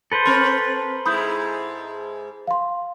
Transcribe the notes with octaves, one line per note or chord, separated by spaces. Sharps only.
A4 B4 C5
C4 A#4 C6
G#2 G#3 E4 B5 D#6 G6
F5 C6